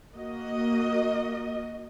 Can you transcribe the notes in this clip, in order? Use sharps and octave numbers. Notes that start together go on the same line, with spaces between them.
A#3 F#4 D#5